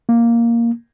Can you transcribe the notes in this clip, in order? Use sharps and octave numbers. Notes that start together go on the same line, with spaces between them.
A#3